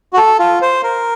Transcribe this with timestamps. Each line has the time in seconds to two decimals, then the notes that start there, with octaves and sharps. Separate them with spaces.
0.13 F#4
0.18 A4
0.39 F4
0.62 C5
0.83 A#4